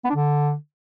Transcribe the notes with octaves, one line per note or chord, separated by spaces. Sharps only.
B3
D4
D3